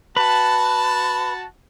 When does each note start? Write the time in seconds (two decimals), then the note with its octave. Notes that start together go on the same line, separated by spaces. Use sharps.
0.16 F#4 B4 A5